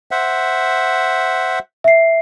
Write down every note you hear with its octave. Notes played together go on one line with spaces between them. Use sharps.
C5 E5 F#5
E5 C7